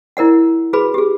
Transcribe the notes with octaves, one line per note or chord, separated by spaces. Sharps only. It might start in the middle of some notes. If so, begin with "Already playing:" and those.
E4 A#4 D5 F#5
F#4 G#4 B4 B5
G4 G#4